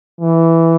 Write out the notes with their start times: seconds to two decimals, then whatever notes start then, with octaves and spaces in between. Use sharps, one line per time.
0.20 E3